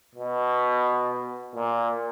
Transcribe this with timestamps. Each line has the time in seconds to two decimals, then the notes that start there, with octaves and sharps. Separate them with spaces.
0.15 B2
1.55 A#2